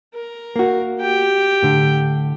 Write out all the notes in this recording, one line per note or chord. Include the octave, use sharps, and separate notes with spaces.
A#4
A#3 F#4
G4 G5
A2 D3